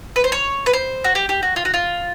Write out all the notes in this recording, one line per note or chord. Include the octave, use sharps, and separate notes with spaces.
B4
C5
C#5
B4
C5
F#4
G4
G4
F#4
F4
F#4
F4